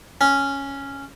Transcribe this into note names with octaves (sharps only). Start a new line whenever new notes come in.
C#4